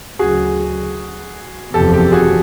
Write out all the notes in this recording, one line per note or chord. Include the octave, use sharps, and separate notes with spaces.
D2 C#3 F#3 F#4 G#4
F#1 E2 C3 F3 G4 A4
G4
F#4 G#4